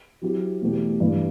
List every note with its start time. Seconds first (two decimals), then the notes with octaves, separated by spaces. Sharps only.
0.22 F#3 C4 E4 G4
0.61 E2 B2 A3 E4 G4
1.00 G2 E3 G3